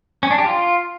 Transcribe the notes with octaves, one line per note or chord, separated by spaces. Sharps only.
C#4
D4
G4
F4